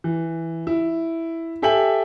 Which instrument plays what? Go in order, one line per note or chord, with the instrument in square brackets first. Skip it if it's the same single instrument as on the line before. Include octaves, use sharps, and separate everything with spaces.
[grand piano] E3
E4
G4 A4 E5 G5 G#5 F#7